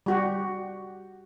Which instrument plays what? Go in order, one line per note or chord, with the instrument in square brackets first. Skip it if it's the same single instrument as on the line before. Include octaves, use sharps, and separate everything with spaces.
[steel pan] G3 F#4 G4